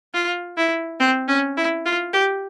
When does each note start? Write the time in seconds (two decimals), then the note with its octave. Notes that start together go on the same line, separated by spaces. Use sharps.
0.14 F4
0.57 E4
1.00 C4
1.28 C#4
1.57 E4
1.85 F4
2.13 G4